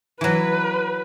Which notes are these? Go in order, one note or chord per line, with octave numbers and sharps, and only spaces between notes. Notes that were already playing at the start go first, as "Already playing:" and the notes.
E3 F#3 B4